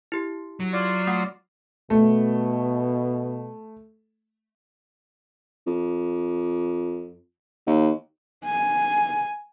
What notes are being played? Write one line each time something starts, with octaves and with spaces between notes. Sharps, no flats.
E4 G4
F#3
F4 D5 C6
A3 F#5 C7
B2 A3
F2
D#2
G#5